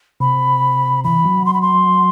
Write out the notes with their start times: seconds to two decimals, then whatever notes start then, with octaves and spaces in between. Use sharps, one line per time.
0.20 C3 B5
1.04 E3 B5
1.25 F#3
1.46 C6
1.53 B5
1.62 C6